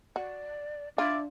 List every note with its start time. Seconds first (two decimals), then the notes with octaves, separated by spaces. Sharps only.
0.16 F#4 D5
0.98 D4 F4 D5 E5